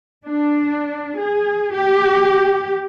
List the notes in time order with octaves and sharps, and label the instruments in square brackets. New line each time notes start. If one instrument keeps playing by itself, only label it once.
[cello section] D4
G#4
G4